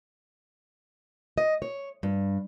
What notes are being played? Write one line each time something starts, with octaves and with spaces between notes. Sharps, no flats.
D#5
C#5
G2